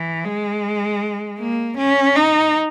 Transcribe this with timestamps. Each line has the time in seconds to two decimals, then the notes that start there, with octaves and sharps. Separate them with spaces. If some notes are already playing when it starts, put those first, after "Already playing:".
Already playing: E3
0.26 G#3
1.39 A#3
1.77 C#4
2.16 D#4